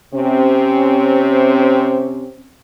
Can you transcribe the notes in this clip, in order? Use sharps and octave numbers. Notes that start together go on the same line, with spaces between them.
C3 C4 C#4